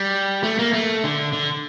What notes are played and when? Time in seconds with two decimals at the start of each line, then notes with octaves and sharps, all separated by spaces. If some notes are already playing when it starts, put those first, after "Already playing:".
Already playing: G3
0.44 A3
0.59 A#3
0.73 A3
1.04 D3
1.33 D3